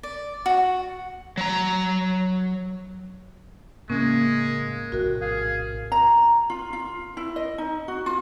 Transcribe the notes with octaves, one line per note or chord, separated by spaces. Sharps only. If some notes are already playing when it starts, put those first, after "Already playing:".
D5
F#4
F#3 A#5
A2 C#3 G#3 A#3 C#4
A#1 A2 C3 F#4 A#4
G#4 F5
A#5
F4
F4
E4
D#5
D#4
F#4
F4